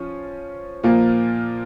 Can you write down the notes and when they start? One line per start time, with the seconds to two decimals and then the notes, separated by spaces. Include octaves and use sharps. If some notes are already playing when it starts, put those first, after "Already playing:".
Already playing: F3 C#4
0.83 A#2 F3 A#3